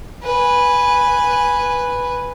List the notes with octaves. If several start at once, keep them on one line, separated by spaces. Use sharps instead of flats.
B4 G#5